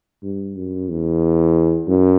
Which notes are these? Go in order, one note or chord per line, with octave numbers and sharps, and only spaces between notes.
G2
F#2
E2
F#2